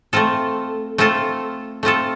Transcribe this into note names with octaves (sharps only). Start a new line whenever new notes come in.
A3 C4 F4 A4
A3 C4 F4 A4
A3 C4 F4 A4